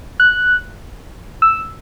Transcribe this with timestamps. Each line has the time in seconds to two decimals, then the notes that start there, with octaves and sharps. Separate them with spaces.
0.20 F#6
1.42 E6